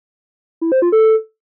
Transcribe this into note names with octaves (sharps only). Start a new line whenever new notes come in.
E4
C5
F4
A4